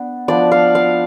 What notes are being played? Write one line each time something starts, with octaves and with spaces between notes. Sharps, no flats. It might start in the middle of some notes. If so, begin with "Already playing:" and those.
Already playing: B3 D4
F3 B3 D4 D5
F5
F5